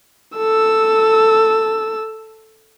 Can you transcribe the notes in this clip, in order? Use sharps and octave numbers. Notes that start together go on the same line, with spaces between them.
A4 E6